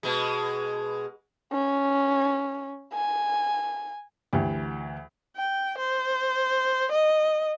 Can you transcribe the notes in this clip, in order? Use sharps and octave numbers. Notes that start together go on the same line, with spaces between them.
B2 G#3
C#4
G#5
D2 E3 G4
G5
C5
D#5